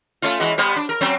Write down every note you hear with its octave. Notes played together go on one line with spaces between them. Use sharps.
A3 C#4 F4
E3 G#3 F#4
G3 B3 C5
D4
A#4
F#3 C4 C#4